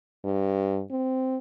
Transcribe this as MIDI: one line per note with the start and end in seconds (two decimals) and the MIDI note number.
0.24 0.82 43
0.91 1.37 60